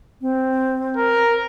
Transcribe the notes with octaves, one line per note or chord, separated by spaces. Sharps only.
C4
A#4